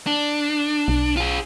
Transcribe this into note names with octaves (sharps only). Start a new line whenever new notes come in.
D4
B1
F4 G#4